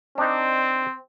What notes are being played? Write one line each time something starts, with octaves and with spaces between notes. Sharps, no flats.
C4 D4 D#4